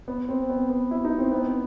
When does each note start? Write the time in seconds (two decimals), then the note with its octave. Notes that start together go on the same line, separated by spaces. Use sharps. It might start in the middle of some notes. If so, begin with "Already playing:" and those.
0.08 B3
0.29 C4
0.49 B3
0.70 B3
0.91 E4
1.05 D#4
1.18 C4
1.32 B3